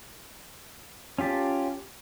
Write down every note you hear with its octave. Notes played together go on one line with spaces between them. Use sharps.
C#4 F4 G4 A5